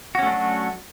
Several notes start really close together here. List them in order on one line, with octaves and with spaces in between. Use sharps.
F#4 C#4 A3 D4 F#3